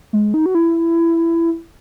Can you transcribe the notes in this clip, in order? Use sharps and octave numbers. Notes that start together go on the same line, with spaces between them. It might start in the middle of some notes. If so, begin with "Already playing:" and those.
G#3
D#4
F#4
E4